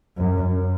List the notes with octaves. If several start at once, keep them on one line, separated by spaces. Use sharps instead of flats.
F#2
F#2